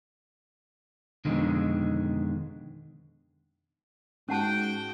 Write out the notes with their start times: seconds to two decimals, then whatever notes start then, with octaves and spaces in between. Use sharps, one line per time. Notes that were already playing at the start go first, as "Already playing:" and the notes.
1.25 F2 B2 D3 D#3 G#3
4.29 G#2 C#4 F#4 F#5 G5 A5